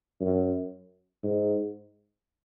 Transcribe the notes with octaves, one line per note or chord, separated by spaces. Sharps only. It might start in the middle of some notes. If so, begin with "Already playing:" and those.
F#2
G#2